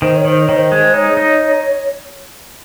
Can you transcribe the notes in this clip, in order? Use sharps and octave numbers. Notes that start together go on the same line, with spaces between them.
D#3 C5
C#5
D#3 C5
C#5
D#3
C5
G#3
D#4 C#5
D#4